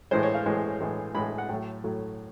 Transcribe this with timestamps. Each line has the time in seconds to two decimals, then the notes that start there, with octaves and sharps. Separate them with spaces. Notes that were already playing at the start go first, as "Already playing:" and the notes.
0.11 A2 E3 G#3 C5
0.23 C#5
0.34 F5
0.46 A2 E3 G#3
0.81 A2 E3 G#3
1.14 A2 E3 G#3 B5
1.38 F#5
1.49 A2 F#3 A3 G5
1.84 A2 F#3 A3